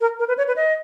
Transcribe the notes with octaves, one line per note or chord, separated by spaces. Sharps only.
A#4
A#4
B4
C#5
B4
D#5